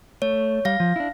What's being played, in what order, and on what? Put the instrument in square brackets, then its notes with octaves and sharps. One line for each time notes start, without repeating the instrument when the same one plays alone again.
[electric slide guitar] A3 [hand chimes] C#5
[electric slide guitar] G3 [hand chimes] F5 A#6
[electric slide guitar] F3
D4 E4